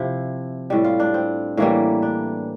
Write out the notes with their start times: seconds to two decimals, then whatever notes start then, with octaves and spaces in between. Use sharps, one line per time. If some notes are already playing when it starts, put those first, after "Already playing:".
Already playing: C3 F3 E4
0.70 A2 G3
0.84 F4
1.00 D4
1.14 C4
1.57 A2 E3 G3 A#3
2.02 D4